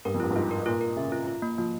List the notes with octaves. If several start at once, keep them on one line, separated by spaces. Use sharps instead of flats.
G2 A#4
F2
G2 F4
G2
G#2 F4
A#4
A#2 F4
A#4
C#3 E5
F4
F4
A#3
F3 A#3